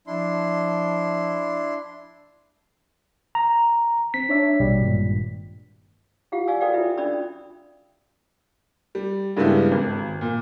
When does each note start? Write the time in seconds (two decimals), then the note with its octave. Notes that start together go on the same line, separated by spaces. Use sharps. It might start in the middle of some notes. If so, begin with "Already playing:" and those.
0.07 F3 D4 E4 C6
3.35 A#5
4.14 C4 B6
4.29 D4 C#5 E5
4.59 A#1 B2 G3
4.81 G#1 G2 A#2
6.32 E4 F4 G4 F5 F#5
6.48 D5 F5 G#5 E6
6.60 F#4 A4 B4 D5 F5 G5
6.73 E4 F4 B4 E5
6.85 A4
6.98 C#4 D4 D5 B5 E6
8.95 G3
9.36 G2 C#3 G#3 B3 E4 G4
9.71 G#1
10.21 A#2